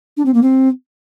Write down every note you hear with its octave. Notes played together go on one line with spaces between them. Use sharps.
D4
C4
A#3
C4